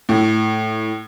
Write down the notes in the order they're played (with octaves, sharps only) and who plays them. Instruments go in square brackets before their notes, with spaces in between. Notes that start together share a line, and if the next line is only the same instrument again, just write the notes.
[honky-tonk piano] A2